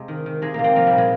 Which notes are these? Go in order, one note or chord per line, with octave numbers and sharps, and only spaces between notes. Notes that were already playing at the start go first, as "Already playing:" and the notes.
Already playing: C3 G#3
D#3
D#3
C3 G#3
C3 A#3
C4
F3 A#3
G3
A#2
G#3